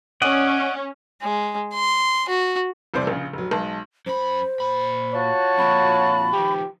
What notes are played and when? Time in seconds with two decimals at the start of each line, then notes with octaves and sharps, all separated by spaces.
0.22 C#4 D5 D#5 F#5
1.22 G#3
1.74 C6
2.29 F#4
2.94 F1 C2 C3 E3 C5 D5
3.07 A#1 C#3
3.33 F1 F#3
3.51 B1 G#3 A5
4.06 F#2 C5 B5
4.60 A#2 B5
5.14 F4 F#4 C#5 A5
5.58 F2 A#2 B5
6.33 D#3 F3 G4